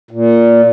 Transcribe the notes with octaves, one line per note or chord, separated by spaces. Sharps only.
A#2